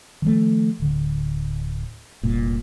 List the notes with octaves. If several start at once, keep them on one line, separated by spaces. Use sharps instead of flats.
D#3 F3 A3
D1 D3
F1 C2 A#2